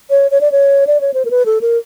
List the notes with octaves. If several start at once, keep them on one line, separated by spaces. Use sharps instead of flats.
C#5
C#5
D5
C#5
D5
C#5
C5
A#4
B4
A4
A#4